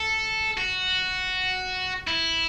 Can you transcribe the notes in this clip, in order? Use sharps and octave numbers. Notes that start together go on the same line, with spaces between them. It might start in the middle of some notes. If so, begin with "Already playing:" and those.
Already playing: A4
F#4
E4